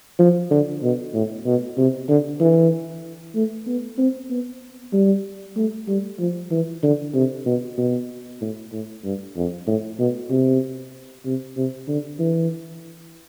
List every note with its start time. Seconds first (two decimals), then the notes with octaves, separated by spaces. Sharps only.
0.19 F3
0.51 D3
0.83 B2
1.14 A2
1.46 B2
1.77 C3
2.09 D3
2.40 E3
3.35 A3
3.67 B3
3.98 C4
4.30 B3
4.93 G3
5.56 A3
5.88 G3
6.19 F3
6.51 E3
6.83 D3
7.14 C3
7.46 B2
7.78 B2
8.41 A2
8.72 A2
9.04 G2
9.36 F2
9.67 A2
9.99 B2
10.30 C3
11.25 C3
11.56 C3
11.88 D3
12.19 E3